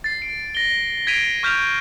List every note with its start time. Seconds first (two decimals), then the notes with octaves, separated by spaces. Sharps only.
0.04 A6 C7
0.22 D7
0.55 A#6 G7
1.07 G#6 B6 C7 D7 D#7 F7
1.43 C#6 F6 G6 B6 E7 F7